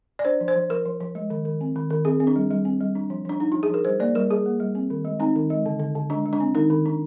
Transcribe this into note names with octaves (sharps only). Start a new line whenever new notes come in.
D5
D4 C5
F3
C5
F3
F3 A#4
F3
F3
G#3
D#3
D#3
C4
D#3
D#3
C4 G#4
C4
D4
G3
G3
C4
G3
D4
F3
F3 D4
D4 D#4
F3 F4
G#4
F3 A#4
G3 C5
A#3 D5
G3 A#4
G3 G#4
A#3
G3
C4
D#3
G#3
C4 D#4
D#3
G#3
D3
D3
D3
G#3 D4
G#3
D4
C4
D#3 D#4
D#3
D4